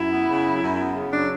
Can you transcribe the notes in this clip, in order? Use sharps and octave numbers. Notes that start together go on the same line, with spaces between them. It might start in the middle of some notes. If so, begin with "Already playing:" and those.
Already playing: F#2 E4
B3
C#3
F#3
F#2
B3
C#3
F#3 D4